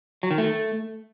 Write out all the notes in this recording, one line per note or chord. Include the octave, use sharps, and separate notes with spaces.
F#3
D#3
A3